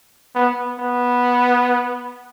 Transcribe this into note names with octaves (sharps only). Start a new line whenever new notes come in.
B3
B3